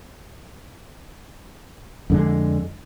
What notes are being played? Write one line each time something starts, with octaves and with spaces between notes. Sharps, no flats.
F2 D3 G#3